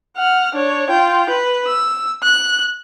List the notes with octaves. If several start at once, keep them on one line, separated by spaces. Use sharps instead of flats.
F#5 F6
D4 C#5
F4 G5
B4
E6
F#6